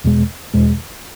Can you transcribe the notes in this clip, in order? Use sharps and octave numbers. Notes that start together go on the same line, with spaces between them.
E2 B2 G#3
E2 B2 G#3